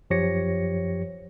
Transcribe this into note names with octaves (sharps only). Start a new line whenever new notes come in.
F#2 F3 G4 C#5 A#6 C#7